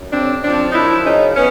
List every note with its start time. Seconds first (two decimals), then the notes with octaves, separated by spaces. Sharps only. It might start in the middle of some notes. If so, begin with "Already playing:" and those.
Already playing: F#2
0.12 C#3 C4 D4
0.43 F3 C4 D4
0.69 D#4
0.73 F#2 D4 E4
1.04 C#3 C#4 D#4
1.34 E3 B3 C#4